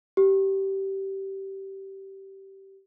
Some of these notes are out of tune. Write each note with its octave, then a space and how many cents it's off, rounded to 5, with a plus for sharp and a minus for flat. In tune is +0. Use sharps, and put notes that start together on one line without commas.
G4 -20